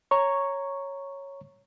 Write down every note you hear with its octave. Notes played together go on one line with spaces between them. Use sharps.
C#5 A#5 C#6